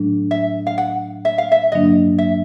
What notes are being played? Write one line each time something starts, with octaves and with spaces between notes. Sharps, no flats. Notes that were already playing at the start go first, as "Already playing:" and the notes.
Already playing: A2 F#3 A3 D4
E5
F5
F#5
E5
F5
E5
G2 D3 F#3 A#3 D4 D#5
E5